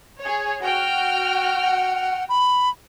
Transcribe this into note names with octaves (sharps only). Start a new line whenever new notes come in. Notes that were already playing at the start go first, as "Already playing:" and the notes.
G#4 C#5
F#4 G5 F6
F#5
B5